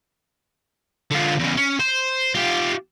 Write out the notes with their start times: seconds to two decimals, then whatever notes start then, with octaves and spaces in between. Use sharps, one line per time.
1.11 D3 F4
1.39 E2 C#3
1.57 C#4
1.80 C5
2.35 F4 G4